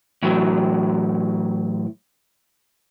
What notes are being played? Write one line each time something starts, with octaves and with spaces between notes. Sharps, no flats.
A2 E3 F#3